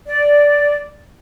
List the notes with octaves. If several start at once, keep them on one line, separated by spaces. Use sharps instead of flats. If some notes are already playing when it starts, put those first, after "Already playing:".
D5